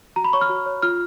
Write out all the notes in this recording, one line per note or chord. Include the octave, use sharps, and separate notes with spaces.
F#4 A#5
B5
C#5 C#6
F6
F#4
C#5
F4 F6